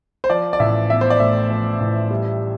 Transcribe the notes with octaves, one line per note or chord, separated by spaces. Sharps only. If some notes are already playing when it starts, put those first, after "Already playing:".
C5
F3 D5
D5
A1 E5
B3 E5
C5
D5
A2 E5
F3
A1
G3